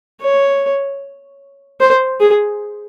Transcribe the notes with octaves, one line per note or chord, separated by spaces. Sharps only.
C#5
C5
G#4